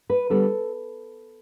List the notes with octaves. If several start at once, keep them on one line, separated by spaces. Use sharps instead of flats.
B4
D3 G3 B3 A4